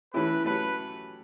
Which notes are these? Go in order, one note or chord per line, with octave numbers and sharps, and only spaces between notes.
E3 A3 C#4 E4 G4 B4
F#3 A3 C#4 G4 B4 C#5